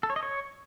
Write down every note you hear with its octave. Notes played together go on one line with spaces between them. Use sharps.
A4
C#5
D#5
C#5